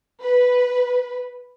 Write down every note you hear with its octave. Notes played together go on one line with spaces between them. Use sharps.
B4